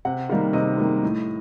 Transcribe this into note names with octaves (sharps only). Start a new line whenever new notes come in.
C3 F#5
D#3 G3 A#3 F5
C3 D#5
D#3 G3 A#3
A2